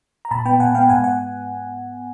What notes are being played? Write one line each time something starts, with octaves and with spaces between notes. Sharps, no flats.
A#5
A#2 A5 B5
B3 G5 A5
A#2 F#5 G#5
B3 F5 G5
G#2 F#5 G#5
F#5 G#5